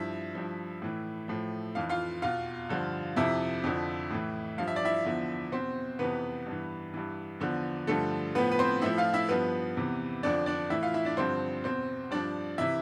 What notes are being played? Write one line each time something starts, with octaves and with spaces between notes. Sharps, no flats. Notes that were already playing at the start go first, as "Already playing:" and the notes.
Already playing: G2 F3 E4 E5
G2 F3
A2 E3
A2 F3
F2 E3 F5
F4 F5
E2 B2 F4 F5
G2 D3 F3
F2 C3 F3 E4 E5
F2 D3 F3
A2 E3
G2 F3 F5
E5
D5
E4 E5
E2 D3 F3
E2 B2 C4 C5
F2 C3 E3 B3 B4
G2 E3
G2 E3
E2 D3 F3
G2 D3 F3 A3 A4
A2 F3 B3 B4
B4
C4 C5
A2 F3 E4 E5
F4 F5
E4 E5
G2 F3 B3 B4
E2 C3 E3
F2 D3 F3 D4 D5
D4 D5
A2 E3 E4 E5
F4 F5
E4 E5
D4 D5
G2 D3 F3 C4 C5
E2 B2 C4 C5
G2 F3 D4 D5
C3 E3 E4 E5